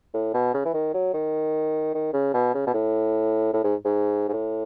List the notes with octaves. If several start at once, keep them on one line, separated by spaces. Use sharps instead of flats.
A2
B2
C#3
E3
D#3
F#3
D#3
D#3
C#3
B2
C#3
B2
A2
A2
G#2
G#2
G#2
A2